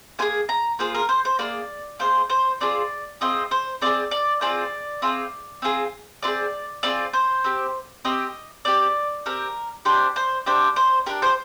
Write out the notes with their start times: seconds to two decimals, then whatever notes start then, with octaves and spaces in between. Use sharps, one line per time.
0.19 A#3 F4 G#4 G#5
0.49 A#5
0.79 A#3 F4 G#4 C5
0.94 A#4
1.09 C5
1.25 C5
1.39 A#3 F4 G#4 D5
1.99 A#3 F4 G#4 C5
2.30 C5
2.61 C4 F4 G#4 D5
3.21 C4 F4 G#4 D#5
3.51 C5
3.81 C4 F4 D5
3.86 G#4
4.11 D5
4.41 C4 F4 G#4 D5
5.02 C4 F4 G#4
5.62 C4 F4 G#4
6.23 C4 F4 D5
6.27 G#4
6.83 C4 F4 G#4 D5
7.13 C5
7.44 C4 G4
8.05 C4 G4 D#5
8.65 C4 G4 D5
9.26 C4 G4 A#4
9.85 D4 G4 C5
10.16 C5
10.46 D4 G4 C5
10.76 C5
11.06 D4 G4 A#4
11.22 C5